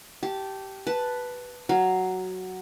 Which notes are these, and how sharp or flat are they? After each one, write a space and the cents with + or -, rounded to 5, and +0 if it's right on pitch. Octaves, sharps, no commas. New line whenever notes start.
G4 -15 A5 -5
B4 +0 A5 +0
F#3 +5 F5 +0